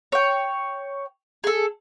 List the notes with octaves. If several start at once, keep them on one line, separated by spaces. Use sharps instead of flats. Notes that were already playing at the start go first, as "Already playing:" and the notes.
C#5 G5
G#4 A4